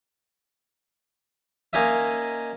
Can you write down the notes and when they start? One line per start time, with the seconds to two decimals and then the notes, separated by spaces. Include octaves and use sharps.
1.73 A#3 C#4 D#4 D#5 E5